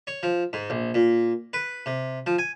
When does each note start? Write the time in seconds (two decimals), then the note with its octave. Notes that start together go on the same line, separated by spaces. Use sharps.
0.07 C#5
0.23 F3
0.53 G#2
0.70 A#1
0.94 A#2
1.53 B4
1.86 C3
2.26 F3
2.38 G#5